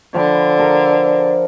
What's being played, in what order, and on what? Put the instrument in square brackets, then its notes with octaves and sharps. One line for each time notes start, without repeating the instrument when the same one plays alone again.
[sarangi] D3 [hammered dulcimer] F3 G5 B5
[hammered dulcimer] A4 A#4